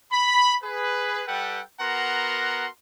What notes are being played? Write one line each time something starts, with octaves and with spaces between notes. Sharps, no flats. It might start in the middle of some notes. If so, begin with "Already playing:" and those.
B5
G#4 B4
G3 A4 B4 F#5 G5
B3 F#4 A#4 F#5 A#5 C6